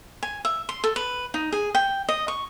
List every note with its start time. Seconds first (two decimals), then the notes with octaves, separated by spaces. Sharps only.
0.23 G#5
0.45 E5
0.69 C6
0.84 A4
0.96 B4
1.34 D#4
1.52 G#4
1.75 G5
2.09 D#5
2.28 C#6